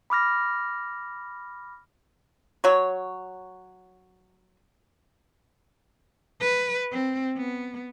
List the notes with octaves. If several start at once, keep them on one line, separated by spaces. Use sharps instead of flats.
B5 D6 F6 A#6
F#3 C#5
B4
C4
B3